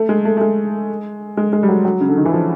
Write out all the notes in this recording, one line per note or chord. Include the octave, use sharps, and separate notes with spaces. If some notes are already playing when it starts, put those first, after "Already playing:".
Already playing: A3
G#3
A3
A3
G#3
G#3
G#3
G3
F#3
F#3
C#3
D3
D#3
E3
F3